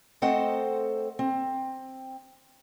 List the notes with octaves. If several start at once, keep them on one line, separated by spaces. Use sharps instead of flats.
A3 C4 A4 C5 D#5 F#5
C4